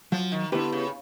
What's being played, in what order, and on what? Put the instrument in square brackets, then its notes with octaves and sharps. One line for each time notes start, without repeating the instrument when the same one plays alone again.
[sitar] F3 [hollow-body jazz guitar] F#3
[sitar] D#3
[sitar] D3 [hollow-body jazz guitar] B3 E4 G4 B4
[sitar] C#3